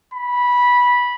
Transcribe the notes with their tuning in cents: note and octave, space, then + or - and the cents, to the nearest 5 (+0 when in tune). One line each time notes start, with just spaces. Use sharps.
B5 -15